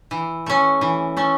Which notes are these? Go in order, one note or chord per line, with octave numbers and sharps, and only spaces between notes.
E3
A3 C#4
E3
A3 C#4